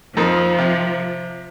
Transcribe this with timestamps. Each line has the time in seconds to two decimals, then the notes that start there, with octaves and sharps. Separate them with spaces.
0.17 F2 F3 A#3 D#4
0.58 C3